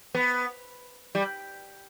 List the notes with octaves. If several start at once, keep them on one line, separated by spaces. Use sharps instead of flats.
B3
G3